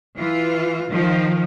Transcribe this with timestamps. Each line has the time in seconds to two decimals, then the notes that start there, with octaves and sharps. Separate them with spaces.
0.17 E3 F4
0.92 D#3 F3